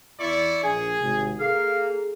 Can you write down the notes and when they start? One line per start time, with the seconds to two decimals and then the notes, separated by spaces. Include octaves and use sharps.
0.20 E2 E4 D5 C#6
0.64 A#1 G#4 G#5
1.01 G#1 C3
1.40 A#3 G#4 A4 F5